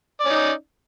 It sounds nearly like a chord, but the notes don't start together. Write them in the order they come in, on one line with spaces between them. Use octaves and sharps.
D5 C#4 D#4